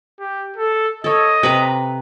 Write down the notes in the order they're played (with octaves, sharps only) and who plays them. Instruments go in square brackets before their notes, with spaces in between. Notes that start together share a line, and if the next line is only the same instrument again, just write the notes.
[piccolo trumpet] G4
A4
[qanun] A4 C#5 [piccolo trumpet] D#5
[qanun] C3 B4 A#5